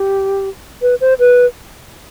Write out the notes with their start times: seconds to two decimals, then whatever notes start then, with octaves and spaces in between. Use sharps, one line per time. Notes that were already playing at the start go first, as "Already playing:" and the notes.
Already playing: G4
0.82 B4
1.01 C5
1.19 B4